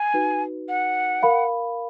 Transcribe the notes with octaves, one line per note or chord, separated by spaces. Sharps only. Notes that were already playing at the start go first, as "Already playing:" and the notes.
Already playing: G#5
D#4 F#4 B4
F#5
A#4 F5 B5